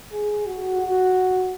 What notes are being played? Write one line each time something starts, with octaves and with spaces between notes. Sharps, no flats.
G#4
F#4
F#4